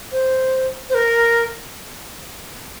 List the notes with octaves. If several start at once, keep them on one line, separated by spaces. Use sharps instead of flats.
C5
C5
A#4